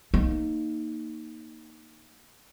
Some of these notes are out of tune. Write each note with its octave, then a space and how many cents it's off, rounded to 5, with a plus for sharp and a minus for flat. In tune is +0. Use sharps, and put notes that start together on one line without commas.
A#3 +0 D#4 +0